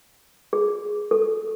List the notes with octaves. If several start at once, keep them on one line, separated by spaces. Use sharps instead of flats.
G#4
A4